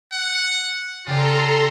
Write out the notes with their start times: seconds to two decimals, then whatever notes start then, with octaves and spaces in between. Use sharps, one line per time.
0.12 F#5
1.07 C#3 F4 G4 A4 D5 A#5 C6